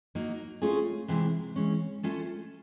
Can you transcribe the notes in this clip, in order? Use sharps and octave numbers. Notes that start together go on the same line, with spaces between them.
F#3 A#3 D#4
A3 C#4 F4 G#4 C5
C3 E3 G#3 C4 E4
E3 G#3 C#4
A3 C#4 F4 A4 C5